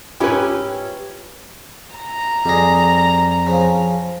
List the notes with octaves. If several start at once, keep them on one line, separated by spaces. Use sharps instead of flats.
G#2 C#4 E4 F4 G4 B4 G#5
A#5
F2 G3 G#4 A#6
C#3 F3